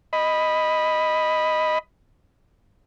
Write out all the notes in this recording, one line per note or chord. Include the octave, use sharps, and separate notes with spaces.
D#5 B5